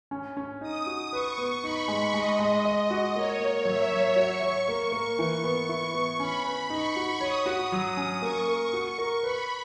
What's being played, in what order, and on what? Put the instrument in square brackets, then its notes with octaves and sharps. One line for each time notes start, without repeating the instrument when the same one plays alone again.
[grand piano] C#4
C#4
[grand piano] D#4 [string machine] D#6
[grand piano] F#4
[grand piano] B4 [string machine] C#6
[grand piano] B3
[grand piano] D#4 [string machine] B5
[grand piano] G#3
[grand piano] G#3 [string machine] D#5
[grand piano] G#3
D#5
F#4
[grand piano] A#3 [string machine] C#5
[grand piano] A#3
[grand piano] F#3 [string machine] E5
[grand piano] F#3
[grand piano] F#4 [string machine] C#6
[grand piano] C#5
A#3
A#3
[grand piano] E3 [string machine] C#6
[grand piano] B3
E4
B3
[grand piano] C#4 [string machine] B5
[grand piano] B4
[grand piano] D#4 [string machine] C#6
[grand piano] F#4
[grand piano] C#5 [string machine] D#6
[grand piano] F#4
F#3
C#4
[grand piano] A#3 [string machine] C#6
[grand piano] A#4
[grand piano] F#4 [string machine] C#6
[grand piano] A#4
[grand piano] B4 [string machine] B5